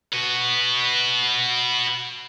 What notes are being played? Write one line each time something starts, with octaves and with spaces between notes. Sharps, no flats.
F#4 B4